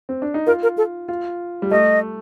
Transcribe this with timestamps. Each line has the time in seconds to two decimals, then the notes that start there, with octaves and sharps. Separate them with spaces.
0.09 C4
0.22 D4
0.34 D#4
0.47 F4 A#4
0.63 A#4
0.78 A4
1.08 F4
1.62 G3
1.71 A3 D#5